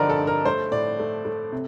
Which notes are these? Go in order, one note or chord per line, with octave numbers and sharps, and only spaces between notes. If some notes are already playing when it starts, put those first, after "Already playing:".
Already playing: G2 D3 F3 A#4 D5 D#5
A4
G2
A#4
A3 C5
A2 D5
A3
A3
C3